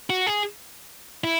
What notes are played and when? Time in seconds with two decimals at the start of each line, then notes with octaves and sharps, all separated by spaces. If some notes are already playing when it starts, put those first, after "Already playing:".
0.10 F#4
0.27 G#4
1.24 E4